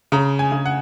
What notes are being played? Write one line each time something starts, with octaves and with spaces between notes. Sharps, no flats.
C#3 A#5
G#5
C#3
F#5